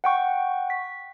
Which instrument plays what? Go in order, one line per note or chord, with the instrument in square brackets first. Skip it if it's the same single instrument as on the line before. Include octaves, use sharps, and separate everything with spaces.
[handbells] F#5 G5 C#6
B6